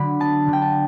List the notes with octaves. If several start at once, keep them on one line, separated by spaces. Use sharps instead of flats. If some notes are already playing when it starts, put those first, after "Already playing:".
Already playing: D3 F#3 B5
B3 A5
D3 G5
A5